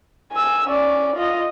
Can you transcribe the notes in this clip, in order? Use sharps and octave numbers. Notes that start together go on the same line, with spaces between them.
G#5 E6
C#4 D5
F4 D#5